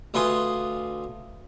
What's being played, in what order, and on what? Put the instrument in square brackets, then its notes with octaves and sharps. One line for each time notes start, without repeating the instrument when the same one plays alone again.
[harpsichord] D2 F4 B4 G#5 C6 D#6